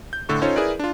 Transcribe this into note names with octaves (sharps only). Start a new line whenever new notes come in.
G6
A2 D3 A4 C#6
C#4 D#4 F4 A4 C5 C#5
E4 G#4 A#4 B4 D5
D4 F4